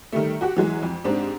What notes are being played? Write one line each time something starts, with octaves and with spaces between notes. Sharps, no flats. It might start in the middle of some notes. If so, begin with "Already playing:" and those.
D#3 G3 A3
F#4 G4 F#5
E3 F#3 G#3
F2
G#2 C4 D4 G4